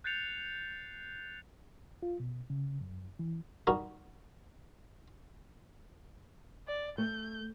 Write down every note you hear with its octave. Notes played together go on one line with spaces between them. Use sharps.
F#6 G6 A6 C7 C#7 F7
F4
B2
C#3
F#2
E3
G3 D#4 F#4 A#4
D5
A3 G6